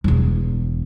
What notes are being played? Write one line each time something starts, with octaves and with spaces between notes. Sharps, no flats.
E1 E2